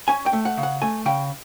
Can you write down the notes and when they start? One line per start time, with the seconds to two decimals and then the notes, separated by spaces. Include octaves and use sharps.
0.08 C#4 G#5
0.26 G5
0.33 A3
0.45 F#5
0.57 C#3
0.63 F#5
0.82 A3 G#5
1.06 C#3 G5